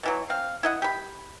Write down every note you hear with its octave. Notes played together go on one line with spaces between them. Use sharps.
B2 E3 F#3
C4 F5
E4 D#5 F#5
G4 B5